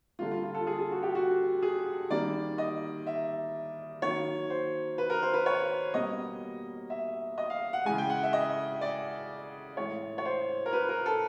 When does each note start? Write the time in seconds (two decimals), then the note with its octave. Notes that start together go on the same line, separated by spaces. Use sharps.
0.19 D3 G3 A#3 F4
0.31 F4
0.43 F4
0.55 A4
0.67 G#4
0.79 G#4
0.91 F#4
1.03 G4
1.15 F#4
1.62 G#4
2.10 D#3 G3 A#3 D5
2.58 D#5
3.07 E5
4.02 D#3 F#3 A#3 C#5
4.50 C5
4.98 B4
5.10 A#4
5.22 C5
5.34 B4
5.46 C#5
5.94 B2 G3 A#3 D#5
6.90 E5
7.38 D#5
7.50 F5
7.73 F#5
7.85 C#3 E3 G#3 G#5
7.98 G5
8.10 F#5
8.23 E5
8.33 D#5
8.81 D5
9.77 A2 E3 G#3 C#5
10.18 C#5
10.25 C5
10.66 A#4
10.73 B4
10.89 A#4
11.06 A4